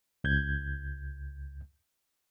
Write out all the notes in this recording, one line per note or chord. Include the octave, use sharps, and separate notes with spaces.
C#2 G6 G#6